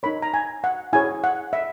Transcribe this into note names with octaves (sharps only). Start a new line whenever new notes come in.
D#4 A#4 C#5 B5
A#5
G#5
F#5
E4 G#4 C#5 G#5
F#5
E5